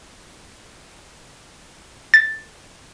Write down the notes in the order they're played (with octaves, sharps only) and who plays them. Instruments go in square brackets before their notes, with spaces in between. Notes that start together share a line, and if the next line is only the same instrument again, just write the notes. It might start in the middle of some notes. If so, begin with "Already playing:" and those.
[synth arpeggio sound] A6